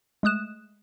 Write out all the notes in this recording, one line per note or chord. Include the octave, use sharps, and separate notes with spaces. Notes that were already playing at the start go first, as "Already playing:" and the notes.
G#3 A3 D#6 F#6 E7